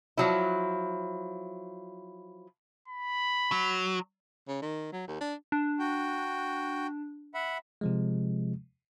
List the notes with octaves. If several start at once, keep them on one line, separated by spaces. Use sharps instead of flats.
F3 F#3 E4
B5
F#3
C#3
D#3
F#3
D#2
D4
D4
F#4 G5
E5 F#5 B5
C3 F3 G#3